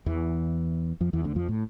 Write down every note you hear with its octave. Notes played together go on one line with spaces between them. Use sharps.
E2 E3
F2 F3
E2 E3
D2 D3
F2 F3
A2